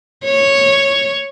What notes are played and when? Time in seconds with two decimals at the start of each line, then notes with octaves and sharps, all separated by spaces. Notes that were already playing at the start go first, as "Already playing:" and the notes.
0.25 C#5